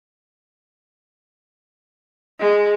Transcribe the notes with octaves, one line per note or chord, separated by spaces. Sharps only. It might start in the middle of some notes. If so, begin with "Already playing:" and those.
G#3